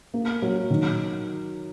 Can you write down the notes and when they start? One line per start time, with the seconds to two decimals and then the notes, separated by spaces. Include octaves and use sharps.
0.14 A#3
0.42 F#3
0.70 D#3